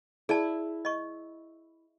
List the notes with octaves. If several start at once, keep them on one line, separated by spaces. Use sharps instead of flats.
E4 G#4 D5 A5
D#5 C#6